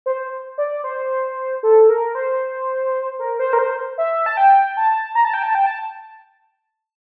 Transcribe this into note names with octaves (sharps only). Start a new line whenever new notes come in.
C5
D5
C5
A4
A#4
C5
A#4
C5
A#4
C5
E5
A5
G5
A5
A#5
A5
G5
A5
G5
A5